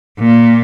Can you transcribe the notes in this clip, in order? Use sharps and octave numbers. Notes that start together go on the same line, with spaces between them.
A#2